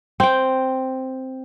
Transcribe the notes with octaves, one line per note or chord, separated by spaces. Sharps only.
C4 G5